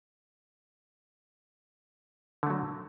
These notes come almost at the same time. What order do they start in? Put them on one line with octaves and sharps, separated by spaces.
D3 A3 F#3